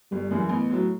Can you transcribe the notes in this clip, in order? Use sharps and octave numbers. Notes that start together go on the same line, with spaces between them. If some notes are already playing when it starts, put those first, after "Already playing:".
G1 G3
F#2 C#3 E3
A1 B3
A2 F#3